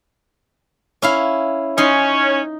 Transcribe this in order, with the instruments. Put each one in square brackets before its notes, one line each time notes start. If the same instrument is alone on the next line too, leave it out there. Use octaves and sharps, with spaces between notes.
[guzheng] C#4 E4 F5
[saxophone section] C#4 [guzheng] D#4 C6